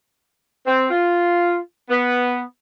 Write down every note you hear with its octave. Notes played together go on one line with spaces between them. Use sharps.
C4
F4
B3